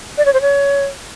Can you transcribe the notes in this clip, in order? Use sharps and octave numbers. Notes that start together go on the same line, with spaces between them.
D5
C#5
C5
C#5